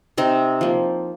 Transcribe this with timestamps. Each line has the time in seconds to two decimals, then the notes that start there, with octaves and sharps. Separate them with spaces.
0.17 C3 C4 D#4
0.61 F3 A#3